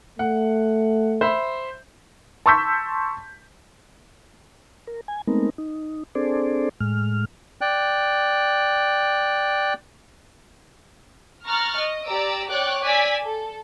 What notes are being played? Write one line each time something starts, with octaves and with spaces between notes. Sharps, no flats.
A3 F#5
C5 E5 B5
A5 C6 C#6 E6 G6 B6
A#4
G#5
G#3 A3 B3 C4 D#4 A#4
D#4
C4 D4 G#4 A4 C5 D5
A2 G#3 F6
D5 G5 F#6
A#5 C#6 F6 F#6 A6
D#5
G4 D5 A#5 E6 D7
C#5 D5 G5 D6 F#6
D5 G#5 E6 G#6 B6
A4